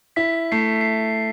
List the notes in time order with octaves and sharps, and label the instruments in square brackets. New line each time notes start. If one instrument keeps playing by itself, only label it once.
[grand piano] E4 [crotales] B6
[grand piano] A3 [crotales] C7
[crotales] C7